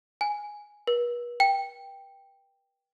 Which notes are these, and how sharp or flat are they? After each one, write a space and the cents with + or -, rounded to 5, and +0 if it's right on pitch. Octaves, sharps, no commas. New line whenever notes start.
G#5 +0
B4 -40
G5 +5